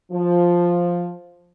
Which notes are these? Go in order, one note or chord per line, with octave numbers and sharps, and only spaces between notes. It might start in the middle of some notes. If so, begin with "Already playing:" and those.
F3